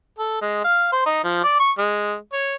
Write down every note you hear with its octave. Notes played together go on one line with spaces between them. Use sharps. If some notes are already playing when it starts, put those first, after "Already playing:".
A4
G#3
F5
C5
D#4
F3
D5
C#6
G#3
C#5